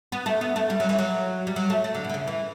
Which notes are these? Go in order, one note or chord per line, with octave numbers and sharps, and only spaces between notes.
B3
A3
B3
A3
G3
F#3
E3
F#3
G3
F#3
A3
A3
D3
B2
D3
C#3
E3